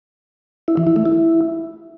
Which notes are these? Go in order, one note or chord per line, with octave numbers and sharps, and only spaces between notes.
E4
E3
E4
A3
E4